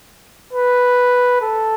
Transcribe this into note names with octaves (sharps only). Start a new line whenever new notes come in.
B4
A4